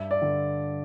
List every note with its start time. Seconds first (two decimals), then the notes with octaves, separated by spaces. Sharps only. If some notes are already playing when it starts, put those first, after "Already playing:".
Already playing: G2 E5
0.11 D5
0.22 D3